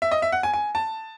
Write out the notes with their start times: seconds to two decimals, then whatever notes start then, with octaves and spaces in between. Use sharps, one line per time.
0.02 E5
0.11 D#5
0.22 E5
0.32 F#5
0.43 G#5
0.54 G#5
0.75 A5